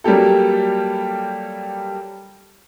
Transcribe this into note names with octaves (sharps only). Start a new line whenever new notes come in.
F#3 G3 A#3 G4 A4